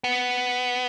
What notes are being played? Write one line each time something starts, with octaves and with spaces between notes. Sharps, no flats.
B3